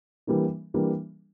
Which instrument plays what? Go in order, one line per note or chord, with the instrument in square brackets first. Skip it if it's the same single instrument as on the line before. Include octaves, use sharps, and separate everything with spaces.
[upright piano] E3 G3 A#3 D4
E3 G3 A#3 D4